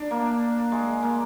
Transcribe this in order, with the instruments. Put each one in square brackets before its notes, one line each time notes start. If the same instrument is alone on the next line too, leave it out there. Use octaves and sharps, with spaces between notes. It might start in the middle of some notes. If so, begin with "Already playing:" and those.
Already playing: [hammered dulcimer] D4
A#3
G#3
A#3